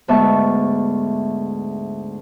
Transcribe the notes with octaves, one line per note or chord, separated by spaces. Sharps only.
D2 G#2 B3 E5 A5 C#6